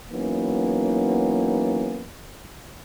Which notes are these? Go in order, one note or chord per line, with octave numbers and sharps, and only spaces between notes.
E3 F#3 A#3 B3 C#4 D#4